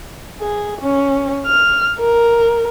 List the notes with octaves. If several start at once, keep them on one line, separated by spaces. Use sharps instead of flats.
G#4
C#4
F6
A#4